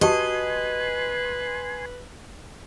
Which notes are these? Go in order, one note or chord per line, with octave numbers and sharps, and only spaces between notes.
F#4 G4 B4 D#5 G#5 A5 C6